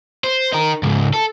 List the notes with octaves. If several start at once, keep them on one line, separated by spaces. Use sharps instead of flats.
C5
D#4 A#4
C#2 G#2
A4